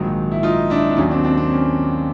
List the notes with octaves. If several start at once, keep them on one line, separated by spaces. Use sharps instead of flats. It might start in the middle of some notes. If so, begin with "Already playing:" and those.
Already playing: A#1 G#2 D#3 F#3
E4
D#4 F4
D4 E4
D4
D#2 D#3 F#3 C#4 D#4
C4 D4
C4 D4
C4
C#4